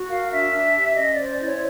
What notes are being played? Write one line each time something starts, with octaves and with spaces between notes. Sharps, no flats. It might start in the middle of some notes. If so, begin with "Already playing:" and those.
Already playing: F#4
A#4 F5
D4 E5
D4
G4
C#4 D#5
D5
C5
D5
E4
C#5